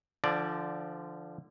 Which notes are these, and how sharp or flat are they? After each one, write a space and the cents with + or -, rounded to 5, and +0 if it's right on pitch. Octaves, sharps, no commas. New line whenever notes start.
D3 +5 F3 -25 D5 +0